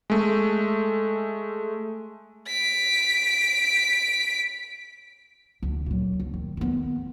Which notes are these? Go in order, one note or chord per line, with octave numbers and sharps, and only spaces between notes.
G#3 A3
B6 D7
D2
A#2 F#3
D2
D#3
D#3 B3